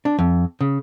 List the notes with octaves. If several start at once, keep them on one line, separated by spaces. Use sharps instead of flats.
D4
F2
C#3